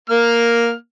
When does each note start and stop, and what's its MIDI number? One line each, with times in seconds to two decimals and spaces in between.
0.09 0.73 58
0.09 0.73 89